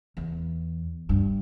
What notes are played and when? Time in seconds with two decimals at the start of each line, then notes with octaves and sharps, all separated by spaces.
0.17 E2
1.09 G2